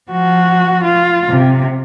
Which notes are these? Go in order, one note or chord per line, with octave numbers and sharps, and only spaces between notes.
F3 F#4
F4
C3